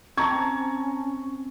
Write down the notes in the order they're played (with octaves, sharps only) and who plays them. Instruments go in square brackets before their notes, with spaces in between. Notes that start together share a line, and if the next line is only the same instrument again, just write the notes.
[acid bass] C4 [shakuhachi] C#4 [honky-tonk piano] A5 A#5 G#6 [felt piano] C#6